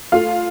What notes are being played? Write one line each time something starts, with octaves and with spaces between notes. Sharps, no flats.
A3 F4 F5